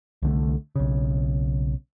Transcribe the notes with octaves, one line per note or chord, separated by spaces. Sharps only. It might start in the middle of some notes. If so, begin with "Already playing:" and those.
C2 D3 A3
B1 C#3